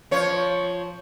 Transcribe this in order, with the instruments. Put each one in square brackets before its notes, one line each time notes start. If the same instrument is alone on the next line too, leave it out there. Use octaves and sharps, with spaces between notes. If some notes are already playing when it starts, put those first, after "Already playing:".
[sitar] F3 C#5